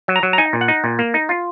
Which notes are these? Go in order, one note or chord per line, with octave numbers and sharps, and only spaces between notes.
F#3
A#5
F#3
A#5
D#4 G#5
A#2
F#5
D#4
A#2
A#3
D#4
F4